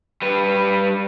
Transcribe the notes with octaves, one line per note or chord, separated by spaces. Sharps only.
G3 B4